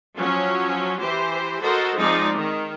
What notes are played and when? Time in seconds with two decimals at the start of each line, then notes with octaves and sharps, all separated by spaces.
0.16 F3 F#3 C#4
1.01 E3 G4 C5
1.62 F#4 A4 A#4 C5 D#5
1.98 F3 G#3 C4 D#4 D5
2.37 D#3